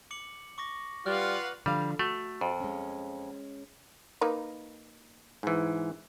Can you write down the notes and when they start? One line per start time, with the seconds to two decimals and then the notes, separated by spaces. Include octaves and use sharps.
0.11 D6 C#7 F#7
0.58 C#6 D6 A#6
1.06 G3 F4 B4 F5 F#5 F6 F#6
1.66 D3 F3 G3 F5
1.99 A3 F#4
2.41 F2
2.60 G#3 C#4
4.21 A#3 D#4 B4
5.43 G#2 E3